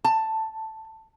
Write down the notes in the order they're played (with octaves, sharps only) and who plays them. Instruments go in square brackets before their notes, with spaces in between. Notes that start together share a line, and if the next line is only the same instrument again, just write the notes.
[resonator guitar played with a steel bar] A5